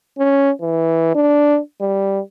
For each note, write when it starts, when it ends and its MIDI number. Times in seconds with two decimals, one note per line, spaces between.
0.19 0.51 61
0.61 1.15 52
1.15 1.59 62
1.81 2.20 55